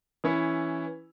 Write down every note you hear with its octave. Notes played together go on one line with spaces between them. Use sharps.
E3 C#4 E4